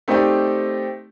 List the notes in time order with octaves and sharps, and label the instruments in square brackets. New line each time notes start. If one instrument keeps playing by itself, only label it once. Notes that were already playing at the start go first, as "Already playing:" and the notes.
[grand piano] A3 C4 D#4 G4 D5